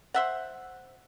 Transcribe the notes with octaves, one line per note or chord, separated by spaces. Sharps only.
C5 E5 F#5